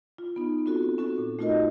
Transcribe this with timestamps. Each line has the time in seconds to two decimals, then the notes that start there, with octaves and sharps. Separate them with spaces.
0.18 F4
0.36 B3 D#4
0.66 C4 F4 F#4 A4
0.98 C#4 F#4 A4
1.18 A#2
1.39 A3 D#4 F4 F#4 A#4 D#5